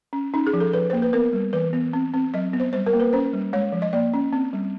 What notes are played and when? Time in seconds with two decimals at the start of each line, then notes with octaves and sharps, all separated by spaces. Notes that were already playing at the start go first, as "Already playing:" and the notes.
0.13 C#4
0.34 C#4 D#4
0.47 G#4
0.53 F3
0.60 A4
0.73 F3 B4
0.90 A#3 C5
1.02 B4
1.13 B3 A#4
1.33 G3
1.53 E3 B4
1.73 B3
1.93 C4
2.14 C4
2.34 F#3 D#5
2.53 B3
2.60 C5
2.73 G3 C5
2.86 A#4
2.93 A#3
3.00 B4
3.13 C#4 C5
3.33 G3
3.53 G#3 C#5
3.72 F3
3.82 D#5
3.93 A#3 D5
4.14 C#4
4.33 C4
4.53 G3